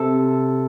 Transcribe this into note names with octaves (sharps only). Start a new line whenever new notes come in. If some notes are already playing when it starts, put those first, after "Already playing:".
Already playing: C3 A4